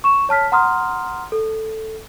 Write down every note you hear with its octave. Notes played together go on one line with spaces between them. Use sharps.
C#6 E7
C#5 A5 F6 B6
F#5 A#5 C6 D#6 F6
A4